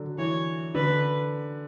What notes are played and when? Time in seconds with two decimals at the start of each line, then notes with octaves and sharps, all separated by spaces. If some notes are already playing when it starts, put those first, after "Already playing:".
Already playing: D3 F#3
0.18 E3 C#5
0.75 D3 B4